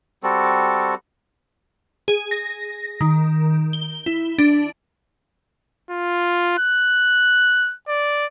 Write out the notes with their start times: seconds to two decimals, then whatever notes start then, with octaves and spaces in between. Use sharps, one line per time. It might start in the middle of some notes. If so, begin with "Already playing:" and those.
0.23 G3 C4 F#4 A4
2.08 G#4
2.31 A#6
3.01 D#3
3.73 G7
4.06 E4
4.38 D4
5.91 F4
6.59 F#6
7.88 D5